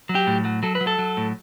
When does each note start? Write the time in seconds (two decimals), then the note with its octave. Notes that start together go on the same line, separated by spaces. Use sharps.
0.09 F#3
0.15 G4
0.27 A2
0.45 F#3
0.63 F#3 A4
0.75 B4
0.81 F#3
0.87 A4
0.99 F#3
1.17 A2